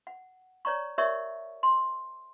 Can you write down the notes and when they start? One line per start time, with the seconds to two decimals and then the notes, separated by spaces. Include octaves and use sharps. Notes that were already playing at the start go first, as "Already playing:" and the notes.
0.07 F#5
0.65 C#5 D5 A#5 C#6
0.98 G4 A#4 C#5 D5 E5 C#6
1.63 C6